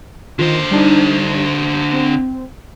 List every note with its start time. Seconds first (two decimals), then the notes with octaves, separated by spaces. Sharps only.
0.39 D3 D#3 F4 C5
0.71 G3 D4 D#4
1.93 C4